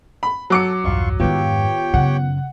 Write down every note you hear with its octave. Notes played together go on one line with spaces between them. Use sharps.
B5
F#3 A4 D6 C#7
B1 E2 G2 F4 C#6
F2 G#2 D#3 B3 F4 G4 C#5 G5
F#2 C#3 F#5